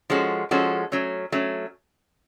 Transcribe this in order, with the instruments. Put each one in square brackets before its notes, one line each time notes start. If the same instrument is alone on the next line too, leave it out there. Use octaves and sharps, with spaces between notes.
[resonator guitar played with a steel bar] F3 G#3 C#4 F#4 A4
F3 G#3 C#4 F#4 A4
F#3 A3 C#4
F#3 A3 C#4